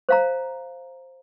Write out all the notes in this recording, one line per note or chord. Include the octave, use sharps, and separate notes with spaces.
C5 F5 A#5